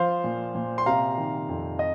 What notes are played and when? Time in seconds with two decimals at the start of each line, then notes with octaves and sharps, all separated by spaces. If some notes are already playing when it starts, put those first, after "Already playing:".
Already playing: F3 C5 F5
0.24 A#2
0.55 A#2
0.78 C6
0.86 C3 F5 A#5
1.17 D#3
1.49 F2
1.79 D#5